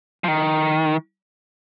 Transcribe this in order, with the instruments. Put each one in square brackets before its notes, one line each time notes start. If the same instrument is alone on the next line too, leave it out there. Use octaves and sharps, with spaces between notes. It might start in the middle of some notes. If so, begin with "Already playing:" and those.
[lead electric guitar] F3
D#3